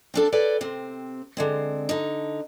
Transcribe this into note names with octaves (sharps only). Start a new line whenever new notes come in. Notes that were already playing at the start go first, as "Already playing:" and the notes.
C4 D4 A4
A4 B4 C#5 D5 G5
C3 C4
D3 G#3 C4
D3 D#4